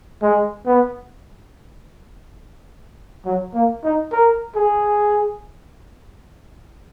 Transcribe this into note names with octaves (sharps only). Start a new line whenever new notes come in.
G#3
B3
F#3
A#3
D#4
A#4
G#4